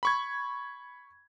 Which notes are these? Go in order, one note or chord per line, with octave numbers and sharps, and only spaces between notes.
B5 C#6 G#6